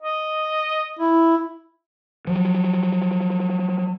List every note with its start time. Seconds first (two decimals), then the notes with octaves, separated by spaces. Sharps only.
0.02 D#5
0.99 E4
2.27 F3 F#3